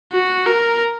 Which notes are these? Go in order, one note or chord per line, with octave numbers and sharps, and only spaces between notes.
F#4
A#4